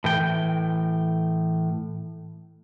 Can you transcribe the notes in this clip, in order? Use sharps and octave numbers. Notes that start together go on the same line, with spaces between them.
A2 E3 G5